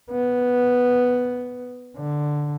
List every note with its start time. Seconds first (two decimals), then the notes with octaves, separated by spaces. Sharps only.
0.11 B3
1.97 D3